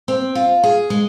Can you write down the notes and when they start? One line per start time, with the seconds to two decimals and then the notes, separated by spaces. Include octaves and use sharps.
0.08 C4
0.35 F4
0.63 G#4
0.90 G#3